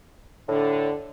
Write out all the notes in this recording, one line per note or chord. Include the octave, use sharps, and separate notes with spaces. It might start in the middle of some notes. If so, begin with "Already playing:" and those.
A2 D3